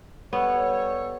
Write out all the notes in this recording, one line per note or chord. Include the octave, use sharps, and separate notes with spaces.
G3 B3 A4 C#5